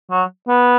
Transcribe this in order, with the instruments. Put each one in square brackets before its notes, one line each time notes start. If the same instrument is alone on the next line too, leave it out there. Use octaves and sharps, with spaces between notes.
[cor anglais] F#3
B3